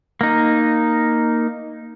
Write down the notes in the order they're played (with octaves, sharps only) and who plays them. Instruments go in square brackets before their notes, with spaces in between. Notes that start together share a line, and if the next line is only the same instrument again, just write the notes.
[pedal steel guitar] A#3 D#4